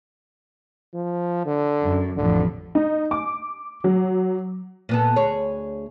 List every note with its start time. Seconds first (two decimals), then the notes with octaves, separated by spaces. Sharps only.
0.94 F3
1.46 D3
1.83 F#2
2.16 A1 F2 D3
2.75 D#4
3.11 D6
3.84 F#3
4.89 A#2 B3 A4
5.16 D2 G#4 C#5